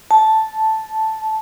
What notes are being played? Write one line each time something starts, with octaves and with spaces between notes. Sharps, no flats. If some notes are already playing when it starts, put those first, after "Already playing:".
A5